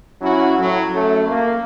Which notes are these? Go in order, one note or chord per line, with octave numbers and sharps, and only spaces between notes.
F#3 C#4 E4 F#4
A2 F#3
F#2 A3
A#3